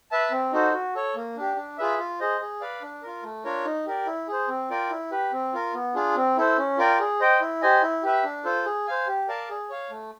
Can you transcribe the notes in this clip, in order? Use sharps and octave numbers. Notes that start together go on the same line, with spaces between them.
B4 E5 A5
C4
D#4 F#4 A4 C5
F#4
A4 C#5
A#3
D4 G4
D4
F4 G#4 B4 E5
F4
G#4 C5 D#5
G#4
B4 D5 F5
D4
F4 A#4
A3
D4 F4 A#4 C#5
D#4
G4 A#4 D5
E4
G#4 C5
C4
F4 A#4 D5 G5
E4
G4 B4
C4
F4 A#4
B3
D4 F4 G#4
C4
E4 A4 C5
C#4
F4 A#4 D5 G5
G#4
C5 D#5 G5
E4
G4 C5 D#5 G#5
E4
G4 B4 E5
D4
F4 A4 C5
G#4
C5 F5 G#5
G4
A#4 D5 F5 A5
G#4
C#5 F5
A3